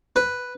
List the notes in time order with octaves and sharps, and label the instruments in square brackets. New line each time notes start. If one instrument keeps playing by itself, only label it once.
[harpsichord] B4